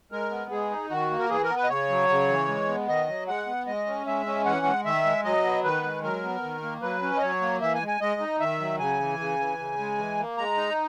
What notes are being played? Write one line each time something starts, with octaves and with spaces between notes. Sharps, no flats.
G#3 A#4
B3
G#3 G#4
D#4
D#3 F#4
A#3
A#4
E3 G#4
A#4
B3
B4
D#5
C#3 C#5
F#3
C#3
E3
G#3
B3
D#3 D#5
F#3
G#3 F#5
B3
G#3 D#5
C#4
G#3 E5
C#4
E3 F#5
G#3
D#3 E5
G#3
F#3 D#5
B3
D#3 B4
G#3
F#3 A#4
B3
D#3
A#3
F#3 B4
C#4
D#5
F#3 C#5
A#3
E3 E5
G#5
G#3
G#5
G#3 D#5
D#4
D#3 E5
F#3
C#3 G#5
E3
C#3
E3
C#3
G#3
E3
A#3
G#3 A#5
D#4